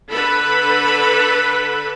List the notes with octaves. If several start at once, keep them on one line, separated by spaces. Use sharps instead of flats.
D3 A4 B4 B5